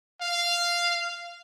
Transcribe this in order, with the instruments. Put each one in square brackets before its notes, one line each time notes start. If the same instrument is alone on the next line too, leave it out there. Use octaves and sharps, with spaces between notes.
[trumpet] F5